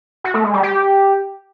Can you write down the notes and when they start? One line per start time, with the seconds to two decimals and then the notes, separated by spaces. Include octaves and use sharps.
0.24 F#4
0.34 A3
0.44 G#3
0.54 G3
0.63 G4